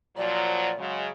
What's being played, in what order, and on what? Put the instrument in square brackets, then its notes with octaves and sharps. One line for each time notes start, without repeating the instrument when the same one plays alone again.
[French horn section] A#2 F3 F#3 [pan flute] D5
[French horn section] C#3 F#3 G#3